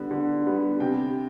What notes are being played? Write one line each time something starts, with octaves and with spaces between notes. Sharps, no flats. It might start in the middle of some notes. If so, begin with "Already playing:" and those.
Already playing: D3 G3 B3
D3
G3 B3
C3 G5